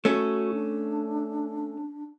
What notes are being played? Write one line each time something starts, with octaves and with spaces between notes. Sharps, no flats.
A3 C#4 F#4
D4